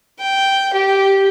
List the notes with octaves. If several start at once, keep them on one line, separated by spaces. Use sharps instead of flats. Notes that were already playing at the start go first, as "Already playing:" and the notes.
G5
G4